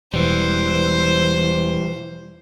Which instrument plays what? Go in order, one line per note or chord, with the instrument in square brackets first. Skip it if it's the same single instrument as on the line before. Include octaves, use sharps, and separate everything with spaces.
[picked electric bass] E1 [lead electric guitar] E3 G3 [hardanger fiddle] C5